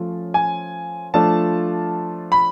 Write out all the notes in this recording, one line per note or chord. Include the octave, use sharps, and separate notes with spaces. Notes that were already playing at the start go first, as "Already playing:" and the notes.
Already playing: F3 A3 C#4 F4
G#5
F3 A3 D4 F4 A5
B5